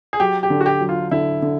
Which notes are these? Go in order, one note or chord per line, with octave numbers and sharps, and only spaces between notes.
G#4
F#3 G4
G4
D3
F#4
G4
F#3
F4
D3 E4
D3